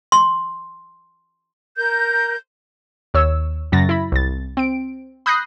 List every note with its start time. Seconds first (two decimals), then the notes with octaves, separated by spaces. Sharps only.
0.12 C6
1.77 A#4 G6
3.14 D#2 C#5 E6
3.72 F#2 C#3 F#3 A6 A#6
3.89 E4 B5
4.12 C2 A6
4.57 C4 D7
5.26 B5 D#6 F#6 G6 A#6 C7